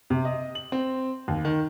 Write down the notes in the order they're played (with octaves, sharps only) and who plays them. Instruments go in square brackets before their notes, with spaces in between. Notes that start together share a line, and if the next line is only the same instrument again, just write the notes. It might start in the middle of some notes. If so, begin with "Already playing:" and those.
[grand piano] C3
D#5
F#7
C4
D#2
D#3